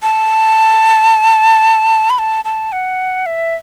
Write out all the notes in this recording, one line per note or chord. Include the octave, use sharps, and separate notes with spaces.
A5
B5
A5
A5
F#5
E5